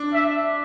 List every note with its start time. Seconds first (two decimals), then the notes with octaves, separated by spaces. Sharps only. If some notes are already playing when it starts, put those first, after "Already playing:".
Already playing: D4
0.14 E5